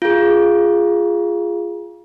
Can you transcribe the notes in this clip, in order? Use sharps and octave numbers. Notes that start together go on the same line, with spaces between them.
F4 G#4